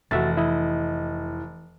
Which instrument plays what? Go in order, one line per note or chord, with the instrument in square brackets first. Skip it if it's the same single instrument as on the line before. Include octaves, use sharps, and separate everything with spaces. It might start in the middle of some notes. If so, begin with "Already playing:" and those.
[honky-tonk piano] F1 [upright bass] E3 [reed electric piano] F#4 E5 A6
[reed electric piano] E4 D#5